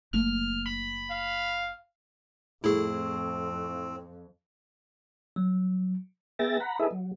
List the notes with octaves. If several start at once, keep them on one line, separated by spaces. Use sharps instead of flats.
F#1 A3 A#3 F6
B5
F5
F2 A2 C4 E4 G#4
F#3
B3 G#4 E5 G5 A6 A#6
F#5 A#5 B5
E4 G#4 A4 B4 D#5 E5
F#3